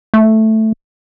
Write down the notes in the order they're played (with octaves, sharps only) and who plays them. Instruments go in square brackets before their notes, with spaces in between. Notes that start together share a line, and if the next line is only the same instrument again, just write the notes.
[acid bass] A3